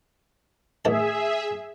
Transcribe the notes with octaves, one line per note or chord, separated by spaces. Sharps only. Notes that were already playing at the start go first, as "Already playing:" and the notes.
A1 D#3 G#4 E5 A5